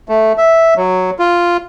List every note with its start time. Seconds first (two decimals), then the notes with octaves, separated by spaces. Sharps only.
0.09 A3
0.38 E5
0.76 F#3
1.19 F4